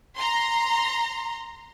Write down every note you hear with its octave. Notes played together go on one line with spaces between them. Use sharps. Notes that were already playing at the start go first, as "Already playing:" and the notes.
A#5 C6